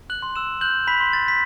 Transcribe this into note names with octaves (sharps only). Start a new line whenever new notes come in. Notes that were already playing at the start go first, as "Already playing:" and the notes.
F#6 F#7
C6
E6 E7
F#6 G6 F#7
B5 B6
C6
A6
B6